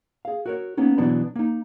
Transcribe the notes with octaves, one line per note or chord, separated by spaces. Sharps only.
G#4 F5
F#4 A#4 C#5
A#3 B3 C#4 D#4
B2 E3 F#3 B3 D4 B5
A#3 D#4